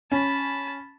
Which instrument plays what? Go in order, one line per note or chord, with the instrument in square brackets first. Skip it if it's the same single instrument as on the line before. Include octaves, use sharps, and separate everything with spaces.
[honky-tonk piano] C#4 [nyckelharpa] A5 B5